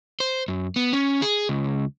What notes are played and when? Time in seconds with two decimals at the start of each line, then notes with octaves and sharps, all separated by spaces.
0.20 C5
0.48 F#2
0.76 B3
0.93 C#4
1.22 G#4
1.49 C#2